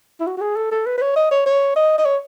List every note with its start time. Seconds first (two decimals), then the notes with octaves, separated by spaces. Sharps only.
0.20 E4
0.27 F#4
0.37 F#4
0.41 G#4
0.56 A4
0.71 A4
0.86 B4
0.97 B4
1.01 C#5
1.16 D#5
1.31 C#5
1.46 C#5
1.76 D#5
1.98 D#5
2.05 C#5